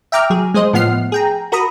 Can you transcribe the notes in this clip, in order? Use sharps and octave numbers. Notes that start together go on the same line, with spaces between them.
E5 G5 A#5 D6 F6
F#3 G#4
G#3 G#4 C5 D#5
A2 F3 B3 F#5 F6 C7
G#4 G5 A#5
F#4 A#4 A#5 B5 D#6